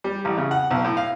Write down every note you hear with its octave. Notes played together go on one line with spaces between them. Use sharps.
G3
A1
C#3
F#5
B1
A2
F5